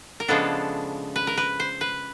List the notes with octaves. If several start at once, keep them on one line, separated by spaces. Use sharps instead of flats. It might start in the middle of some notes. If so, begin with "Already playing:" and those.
A#4
C#3 F3 G#3 B3 D4 A4
B4
A#4
B4
C5
B4